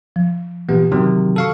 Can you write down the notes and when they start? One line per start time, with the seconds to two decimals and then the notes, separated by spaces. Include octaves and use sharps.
0.16 F3
0.69 A#2 E3 B3 G4
0.92 C3 D#3 F#3
1.36 A4 F5 C#6